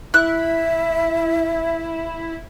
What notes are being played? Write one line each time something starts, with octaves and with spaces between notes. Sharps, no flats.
E4 E5 F#6